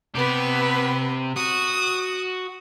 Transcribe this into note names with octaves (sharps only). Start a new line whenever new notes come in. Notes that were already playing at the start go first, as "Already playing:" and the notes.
C3 B3 G4 B4
F#4 D#6